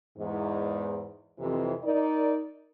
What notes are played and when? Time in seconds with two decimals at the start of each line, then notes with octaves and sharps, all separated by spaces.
0.18 E2 G#2
1.38 F2 C3 E3
1.84 D#4 A#4 D5